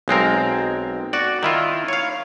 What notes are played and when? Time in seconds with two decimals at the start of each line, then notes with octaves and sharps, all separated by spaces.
0.08 B1 G#3 C4 A#4
1.13 F#4 D5
1.43 D#3 E4 F4
1.88 C#5 F5